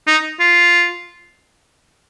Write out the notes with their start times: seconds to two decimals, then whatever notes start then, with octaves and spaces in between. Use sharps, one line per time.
0.07 D#4
0.40 F4